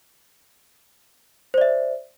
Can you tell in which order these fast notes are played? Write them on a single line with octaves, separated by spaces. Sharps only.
C5 D5 E5